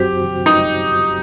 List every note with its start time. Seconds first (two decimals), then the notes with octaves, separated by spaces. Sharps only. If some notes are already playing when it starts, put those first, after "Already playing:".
Already playing: F#2 F#3 C4 F#4 G4 C5
0.46 D#4